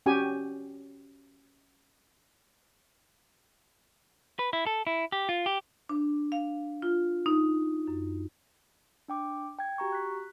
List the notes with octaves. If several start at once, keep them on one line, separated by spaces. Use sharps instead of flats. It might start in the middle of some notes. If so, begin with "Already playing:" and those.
C#4 F#4 G4 G#5
B4
E4
A4
E4
G4
F4
G4
D4
F5
F4
D#4
F#2
D4 G5 D6
G5 G#6
F#4 G4 A#5 C#6
F#6 B6